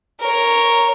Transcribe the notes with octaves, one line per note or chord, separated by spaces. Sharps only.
A#4 C#5